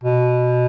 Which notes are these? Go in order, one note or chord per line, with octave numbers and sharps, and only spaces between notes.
B2